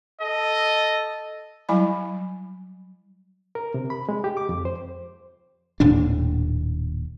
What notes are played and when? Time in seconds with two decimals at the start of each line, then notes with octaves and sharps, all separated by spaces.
0.22 A4 D#5
1.69 F#3 G3 E4 G#5 B5
3.55 A#4
3.74 C3
3.90 B5
4.09 G#3
4.24 G4
4.37 D6
4.49 F2
4.65 C5
5.80 D#1 D#2 A2 D4